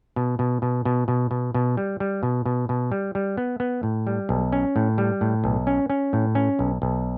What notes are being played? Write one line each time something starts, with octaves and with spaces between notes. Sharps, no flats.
B2
B2
B2
B2
B2
B2
B2
G3
G3
B2
B2
B2
G3
G3
B3
B3
A2
G3
B1
C#4
A2
G3
A2
B1
C#4
C#4
A2
C#4
B1
B1